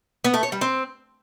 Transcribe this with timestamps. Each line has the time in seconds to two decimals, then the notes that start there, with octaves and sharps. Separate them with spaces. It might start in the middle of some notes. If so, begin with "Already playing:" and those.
0.24 B3
0.34 A3
0.43 C#5
0.52 G3
0.61 C4